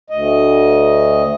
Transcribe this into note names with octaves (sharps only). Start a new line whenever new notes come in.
D2 D#5